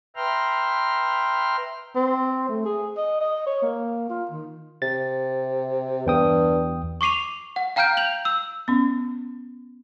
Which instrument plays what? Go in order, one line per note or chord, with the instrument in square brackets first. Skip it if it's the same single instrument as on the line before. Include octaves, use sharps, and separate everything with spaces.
[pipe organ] B4 E5 G5 A#5 C6 F6
[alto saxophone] C4
A3
G#4
D#5
D#5
C#5
A#3
F4
D#3
[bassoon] C3 [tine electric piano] A6
[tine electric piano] E2 G5 D#6 [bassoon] G2
[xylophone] C#6 D6 C7 D#7 F7
F#5
F5 G5 A#5 F6 G6 D7
G6 F7 F#7
E6
[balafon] B3 C#4